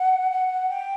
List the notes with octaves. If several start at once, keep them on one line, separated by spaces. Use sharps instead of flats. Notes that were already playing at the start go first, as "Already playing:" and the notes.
Already playing: F#5
F#5
G5